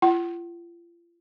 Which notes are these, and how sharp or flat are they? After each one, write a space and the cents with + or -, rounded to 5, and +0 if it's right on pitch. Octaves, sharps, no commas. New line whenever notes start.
F4 -35 F#5 +40